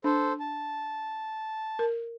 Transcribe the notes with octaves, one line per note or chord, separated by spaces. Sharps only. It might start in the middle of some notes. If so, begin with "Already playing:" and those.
D4 A4 C5
A5
A#4